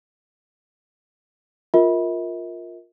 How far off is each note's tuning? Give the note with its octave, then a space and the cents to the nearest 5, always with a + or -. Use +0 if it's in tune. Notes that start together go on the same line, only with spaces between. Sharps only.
F4 +10 A#4 +0 E5 -45